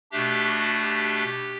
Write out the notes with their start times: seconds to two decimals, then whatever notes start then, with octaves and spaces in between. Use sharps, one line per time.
0.11 B2 A3 D4 G4
0.46 F#4
0.82 G4